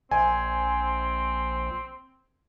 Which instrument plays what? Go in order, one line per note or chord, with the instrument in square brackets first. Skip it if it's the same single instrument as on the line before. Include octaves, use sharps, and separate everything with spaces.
[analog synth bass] A#1 [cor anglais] C4 [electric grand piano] G#5